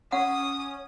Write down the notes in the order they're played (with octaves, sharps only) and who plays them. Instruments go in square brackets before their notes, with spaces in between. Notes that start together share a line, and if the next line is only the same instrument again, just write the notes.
[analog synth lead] C#4 [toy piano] F#5 [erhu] D#6